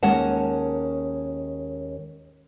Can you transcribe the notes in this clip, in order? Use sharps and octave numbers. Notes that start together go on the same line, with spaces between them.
D#2 G#3 C#4 A#4 F#5 A5